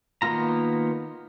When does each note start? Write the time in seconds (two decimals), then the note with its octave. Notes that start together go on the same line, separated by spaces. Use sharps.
0.22 D#3 A#3 B3 F4 A#5